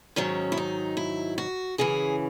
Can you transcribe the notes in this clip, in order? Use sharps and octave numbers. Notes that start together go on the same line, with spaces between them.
G#2 D#3 F#3 C#4
E4
D#4
E4
F#4
F#2 C#3 E3 G#4